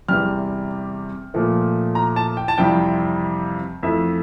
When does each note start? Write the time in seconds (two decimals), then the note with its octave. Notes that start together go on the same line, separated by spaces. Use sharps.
0.09 E2 C3 G3 F6
1.34 A#2 F3 A3
1.95 A#5
2.16 A5
2.37 G5
2.48 A5
2.58 F2 C3 E3 G3 G5
3.83 F2 E3 A3 E5